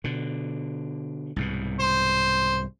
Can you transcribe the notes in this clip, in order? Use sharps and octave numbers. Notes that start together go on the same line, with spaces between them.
B2 D3
C2 G#2 B2
C5